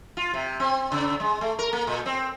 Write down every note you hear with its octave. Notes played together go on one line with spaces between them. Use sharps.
F4
C3
C4
C#3
G#3
A3
A#4
A#3
A#2
C4